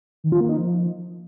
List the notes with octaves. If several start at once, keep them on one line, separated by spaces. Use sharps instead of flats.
D#3
F4
A#3
D#4
F3